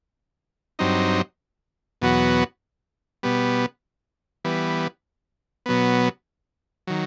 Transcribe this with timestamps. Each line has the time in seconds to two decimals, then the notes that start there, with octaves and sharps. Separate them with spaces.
0.79 G2 F#3 C4 D#4
2.02 E2 B2 F#3 B3 F#4
3.23 B2 G3 B3
4.45 E3 G3 B3
5.66 B2 F#3 B3
6.87 D#3 F#3